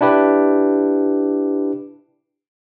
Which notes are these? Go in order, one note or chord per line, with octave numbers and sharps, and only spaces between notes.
D4 E4 G4 B4